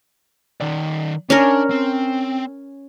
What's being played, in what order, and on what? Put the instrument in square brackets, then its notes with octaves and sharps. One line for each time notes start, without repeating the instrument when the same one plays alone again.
[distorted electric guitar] D#3 D5
[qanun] C#4 A#4 [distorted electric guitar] D4
[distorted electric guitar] C4